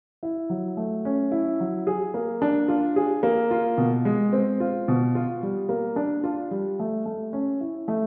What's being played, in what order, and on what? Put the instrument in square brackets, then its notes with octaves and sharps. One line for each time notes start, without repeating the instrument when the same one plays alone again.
[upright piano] E4
F#3
A3
C#4
E4
F#3
G#4
A#3
D4
F4
G#4
A#3
F4
B2
G#3
C4
F4
B2
F4
G3
A#3
D4
F4
G3
A3
A3
C#4
E4
A3